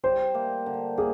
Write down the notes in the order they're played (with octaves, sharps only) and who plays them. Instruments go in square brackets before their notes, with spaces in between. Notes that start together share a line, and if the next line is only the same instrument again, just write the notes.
[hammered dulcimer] G3 [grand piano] C5
[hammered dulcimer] A#3
D3
[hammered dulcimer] A#3 [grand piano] G#4